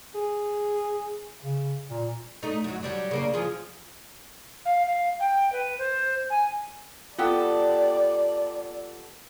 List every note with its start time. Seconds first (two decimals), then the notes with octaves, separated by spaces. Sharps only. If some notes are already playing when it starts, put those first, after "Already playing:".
0.15 G#4
1.43 C#3
1.90 A#2
2.43 A3 D#4
2.64 F#2 F#3
2.83 F#3 G3 D4
3.11 C#3 A#3 D4
3.34 F3 F4 G#4
4.65 F5
4.87 F5
5.20 G5
5.52 B4
5.79 C5
6.30 G#5
7.19 B3 F4 G4 A4 D5